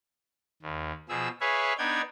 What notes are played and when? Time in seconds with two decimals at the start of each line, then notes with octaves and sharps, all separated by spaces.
0.62 D#2
1.09 B2 F3 G#4 E6
1.41 G#4 B4 C#5 E5 F5
1.78 B3 D4 D#4 G5 G#6